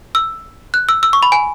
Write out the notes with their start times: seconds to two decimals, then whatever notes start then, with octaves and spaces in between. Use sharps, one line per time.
0.15 E6
0.74 F#6
0.89 E6
1.03 E6
1.13 C#6
1.23 B5
1.32 G#5